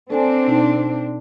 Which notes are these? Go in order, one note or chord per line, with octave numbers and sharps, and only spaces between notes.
C4 D4 A4 C5 G#5
B2 D#4